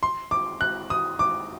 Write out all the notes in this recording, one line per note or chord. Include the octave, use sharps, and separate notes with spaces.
C6
D6
F#6
D#6
D6